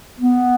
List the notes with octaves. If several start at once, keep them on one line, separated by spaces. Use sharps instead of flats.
B3